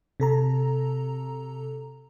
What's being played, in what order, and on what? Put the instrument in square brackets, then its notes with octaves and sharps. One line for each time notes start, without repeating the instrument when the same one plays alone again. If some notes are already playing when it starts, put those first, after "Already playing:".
[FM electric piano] C3 A4 A#5